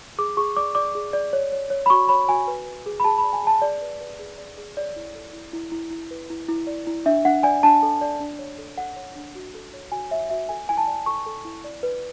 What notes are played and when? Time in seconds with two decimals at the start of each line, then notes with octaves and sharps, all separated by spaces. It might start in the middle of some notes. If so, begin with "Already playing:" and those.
0.18 G#4 D6
0.37 G#4 C#6
0.56 D5 D6
0.75 D5 D6
0.95 G#4
1.13 D5
1.33 C#5
1.52 C#5
1.70 C#5
1.86 B5
1.90 F#4 C#6
2.09 C#5 B5
2.29 F#4 G#5
2.47 B4
2.66 B4
2.86 G#4
3.00 B5
3.04 G#4 A5
3.18 B5
3.23 D5
3.33 G#5
3.43 G#4 A5
3.61 G#4 D5
3.82 B4
4.00 B4
4.19 G#4
4.38 D5
4.58 G#4
4.77 C#5 D5
4.96 E4
5.15 A4
5.33 E4
5.53 E4
5.72 E4
5.91 E4
6.11 B4
6.30 E4
6.48 E4
6.67 D5
6.87 E4
7.06 D4 E5
7.25 D4 F#5
7.43 D5 G#5
7.63 D4 A5
7.83 A4
8.01 D5
8.20 D4
8.39 C#5
8.58 A4
8.77 A4 F#5
8.96 C#5
9.15 D4
9.35 F#4
9.55 A4
9.73 C#5
9.92 F#4 G#5
10.11 C#5 E5
10.30 F#4 E5
10.49 A4 G#5
10.69 E4 G#5
10.78 A5
10.87 D5
11.06 A4 C#6
11.26 A4
11.45 E4
11.64 D5
11.83 B4